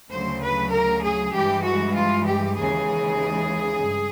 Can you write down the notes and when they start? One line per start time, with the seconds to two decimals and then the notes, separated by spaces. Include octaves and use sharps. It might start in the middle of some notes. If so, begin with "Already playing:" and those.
0.10 D2 C#3 F#3 C5
0.42 B4
0.72 A#4
1.03 G#4
1.33 G2 E3 G#3 G4
1.65 F#4
1.95 F4
2.26 G4
2.57 D#2 C#3 E3 G#3 G#4
3.81 G2